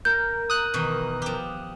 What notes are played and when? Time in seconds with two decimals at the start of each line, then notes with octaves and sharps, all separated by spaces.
0.05 A#4 G6
0.50 D#6 F#6
0.74 B2 D#3 E3
1.22 F3 G4